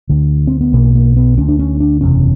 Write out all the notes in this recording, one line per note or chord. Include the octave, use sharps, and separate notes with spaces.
D2 D3
C4
B3
B1 B2 A#3
A#3
B3
D2 D3 C#4
D4
C#4
D4
F#1 E2 C3 C#4